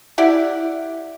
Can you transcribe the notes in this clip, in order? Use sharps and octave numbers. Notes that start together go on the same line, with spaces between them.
E4 G4 D5 F#5